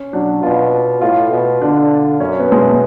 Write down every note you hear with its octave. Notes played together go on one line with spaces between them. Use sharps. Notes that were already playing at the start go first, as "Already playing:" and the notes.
Already playing: C#4
F#3 D4
B2 F4
A2 F4
B2
D3 D4
F#2 C#4
B3
G#3
A3